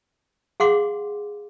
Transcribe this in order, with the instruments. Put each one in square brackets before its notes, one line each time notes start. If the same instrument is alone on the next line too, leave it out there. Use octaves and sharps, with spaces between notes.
[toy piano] G#4 F5 F#5 C6 D6